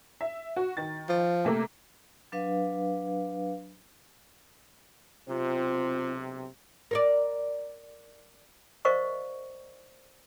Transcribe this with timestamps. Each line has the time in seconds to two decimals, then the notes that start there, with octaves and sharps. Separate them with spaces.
0.21 E5
0.56 F#4
0.77 D#3 A6
1.09 F3
1.45 C3 A3 A#3
2.32 F#3 D4 B4 F5
5.28 B1 C3 C4 F4
6.91 A#4 C#5 D5
8.85 A#4 C5 D5 D#5 F5 C#6